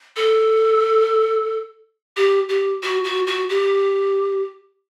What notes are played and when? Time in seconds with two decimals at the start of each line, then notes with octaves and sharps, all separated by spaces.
0.16 A4
2.16 G4
2.49 G4
2.83 F#4
3.04 F#4
3.27 F#4
3.49 G4